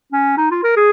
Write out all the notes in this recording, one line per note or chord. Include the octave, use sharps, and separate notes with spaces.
C#4
D#4
F4
A#4
G#4